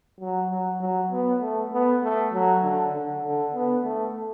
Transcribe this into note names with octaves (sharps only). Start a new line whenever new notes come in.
F#3
F#3
F#3
B3
A3
B3
A3
F#3
D3
D3
D3
B3
A3